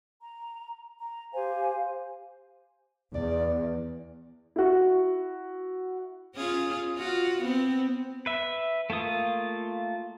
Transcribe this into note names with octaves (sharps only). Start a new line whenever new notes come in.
A#5
A#5
G4 C5 F5 G#5
E2 D5
E4 F#4
C#4 F4 G#4
F4 F#4
B3 C4
B4 E5
A3 A#3 F4 D#6